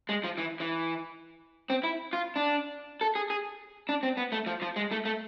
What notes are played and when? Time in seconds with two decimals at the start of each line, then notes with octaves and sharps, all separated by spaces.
0.09 G#3
0.24 F3
0.38 E3
0.60 E3
1.70 C4
1.84 E4
2.13 F4
2.36 D4
3.01 A4
3.15 G#4
3.30 G#4
3.89 D4
4.03 C4
4.17 B3
4.32 A3
4.46 F3
4.62 F3
4.76 G#3
4.91 A3
5.05 A3